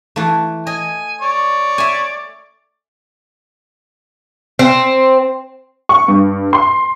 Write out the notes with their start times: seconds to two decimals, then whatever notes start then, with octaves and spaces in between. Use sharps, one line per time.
0.16 E3 A3
0.67 D#5 G#5
1.22 C#5 D5
1.78 E5 G#5
4.59 C4
5.89 C#6
6.08 G2
6.53 C6